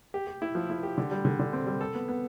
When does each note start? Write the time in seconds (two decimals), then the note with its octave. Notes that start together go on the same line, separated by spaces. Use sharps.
0.14 G4
0.27 G4
0.42 E4
0.55 F3
0.70 E4
0.83 G4
0.98 D3
1.11 G3
1.25 D3
1.39 D3
1.53 C4
1.67 G3
1.81 A4
1.95 B3
2.08 B3